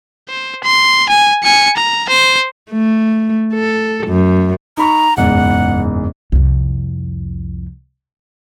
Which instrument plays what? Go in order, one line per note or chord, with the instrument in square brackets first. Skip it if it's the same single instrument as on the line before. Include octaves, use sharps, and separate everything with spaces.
[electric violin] C5
C6
G#5
G#5 C#7
A#5
C5
[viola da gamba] A3
A4
F#2
[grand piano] D#4 B5 C#6 [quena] A#5
[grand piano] F#1 E2 G#2 [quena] F#5
[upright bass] C2 F2